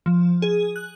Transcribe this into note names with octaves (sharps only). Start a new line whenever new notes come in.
F3
G#4
F#6